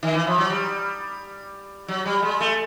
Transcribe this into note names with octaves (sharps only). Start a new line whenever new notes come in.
D#3
E3
F3
F#3
G3
F#3
G3
G#3
A3